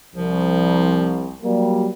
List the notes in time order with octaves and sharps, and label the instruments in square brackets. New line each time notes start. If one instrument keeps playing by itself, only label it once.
[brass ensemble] C2 [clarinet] F3
[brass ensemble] F#3 G3 A#3